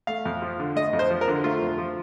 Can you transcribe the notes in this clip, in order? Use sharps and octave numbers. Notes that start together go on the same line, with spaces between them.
A3 F5
F2
F3
D3
A3 D#5
F2
C5
F3
A#4
D3
A3 F4
F2
F3